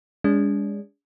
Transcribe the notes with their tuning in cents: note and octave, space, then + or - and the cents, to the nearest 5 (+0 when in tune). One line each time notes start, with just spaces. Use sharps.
G#3 -30 D4 -45